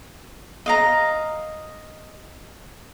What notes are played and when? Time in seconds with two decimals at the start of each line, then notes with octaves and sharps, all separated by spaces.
0.66 D#5 F5 A#5